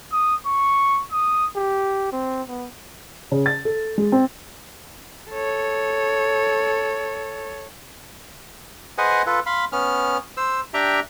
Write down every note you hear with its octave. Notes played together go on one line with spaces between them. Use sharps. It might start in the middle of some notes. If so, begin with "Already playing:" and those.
D#6
C#6
D#6
G4
C4
B3
C#3
A6
A4
G#3
C4
A4 C#5
G#4 B4 C5 D#5 F#5 G#5
F4 A4 B4
F5 B5 C6
B3 C#4 F6
C5 E6
D4 G4 E5 G5 A#5